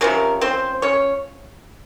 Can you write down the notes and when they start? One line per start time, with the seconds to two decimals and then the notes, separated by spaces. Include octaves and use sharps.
0.01 C3 F3 G#3 A#3 C#4 A#4
0.41 C4 C5
0.82 C#4 C#5